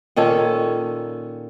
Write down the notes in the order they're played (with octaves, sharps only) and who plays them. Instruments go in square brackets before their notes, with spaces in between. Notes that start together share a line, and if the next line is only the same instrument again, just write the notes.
[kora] A#2 D#3 C#4 A4